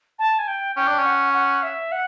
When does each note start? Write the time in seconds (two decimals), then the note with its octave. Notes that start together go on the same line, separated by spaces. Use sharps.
0.19 A5
0.39 G#5
0.48 G5
0.76 C#4 G5
0.87 D4
0.99 C#4
1.05 F#5
1.34 F#5
1.63 E5
1.92 F#5